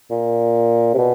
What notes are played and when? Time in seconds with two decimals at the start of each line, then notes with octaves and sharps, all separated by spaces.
0.10 A#2
0.94 C3
0.98 B2